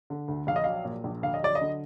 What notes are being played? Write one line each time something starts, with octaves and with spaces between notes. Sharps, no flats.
D3
D2
A#1 F5
D#5
F#3 F5
A#2
A#1
D2 F5
D#5
F#3 D5
D#5
D3